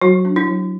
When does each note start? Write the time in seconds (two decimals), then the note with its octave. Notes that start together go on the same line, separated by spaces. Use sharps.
0.01 F#3 F#4
0.25 D4
0.36 E4
0.47 F#3